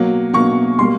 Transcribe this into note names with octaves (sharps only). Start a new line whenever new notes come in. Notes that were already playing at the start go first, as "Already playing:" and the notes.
Already playing: B2 F#3 A#3
B2 F#3 A#3 C#6
B2 G3 A#3 C6